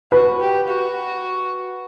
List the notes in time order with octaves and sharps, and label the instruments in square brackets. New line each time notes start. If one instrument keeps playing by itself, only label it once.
[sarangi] F#4 [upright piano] B4
[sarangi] G4
F#4